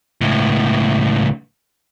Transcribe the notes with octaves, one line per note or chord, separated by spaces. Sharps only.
C#2 A2